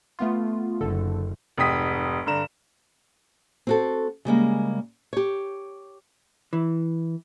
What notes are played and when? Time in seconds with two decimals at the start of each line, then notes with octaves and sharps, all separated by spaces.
0.19 A3 B3 F4
0.81 F#1 D3 A4
1.57 F1 G#2 G5 D#6 B6
2.26 G2 D3 A#5 E7
3.67 C4 F#4 A4
4.25 C#3 G3 G#3 A#3
5.13 G4 C#5
6.53 E3